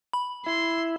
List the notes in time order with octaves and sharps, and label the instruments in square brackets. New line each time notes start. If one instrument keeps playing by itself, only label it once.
[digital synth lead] B5
[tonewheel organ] E4 [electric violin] C6